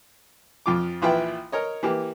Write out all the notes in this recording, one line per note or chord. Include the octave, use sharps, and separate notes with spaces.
F2 F4 D6
A#1 E3 E4 F4 B4 G5
A#4 C#5 D#5
E3 A#3 G4